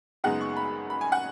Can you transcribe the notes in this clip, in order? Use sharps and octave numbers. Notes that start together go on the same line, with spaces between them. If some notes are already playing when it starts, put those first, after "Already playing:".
F#2 C#3 G#3 B3 D#4 F#5
C#6
B5
B5
G#5
F#5